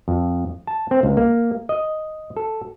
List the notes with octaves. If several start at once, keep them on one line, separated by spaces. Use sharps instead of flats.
F2
A5
C4
C#2
A#3
D#5
A4